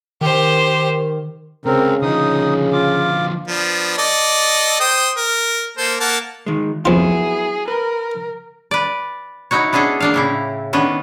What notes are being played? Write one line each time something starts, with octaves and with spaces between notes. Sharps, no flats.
D#3 G4 C5
C#2 C#3 C4 A#4
D3 F3 D#4 D#6
F4 D6
F3 B3 D4
A4 D5 D#5
C5 G5 D#6
A#4
A#3 A4 C5
A#3 F#5 A5
D#3 G#3
F2 F#3 B3 E4 F4 G#4
A#4 B4
B4 D5
D#4 E4 F#4 C#5
B3 C#4 D4 G#4 A4
A#3 D4 F5
A2 C#3 E4
D#3 B3 C#4 D4